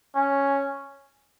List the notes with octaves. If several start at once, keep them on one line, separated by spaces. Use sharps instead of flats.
C#4